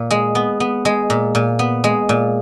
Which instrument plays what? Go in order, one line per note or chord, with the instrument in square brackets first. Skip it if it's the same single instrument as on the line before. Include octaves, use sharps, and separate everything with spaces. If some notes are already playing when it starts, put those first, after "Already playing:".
Already playing: [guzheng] A#2
G#3
B3
B3
G#3
A#2
A#2
B3
G#3
A#2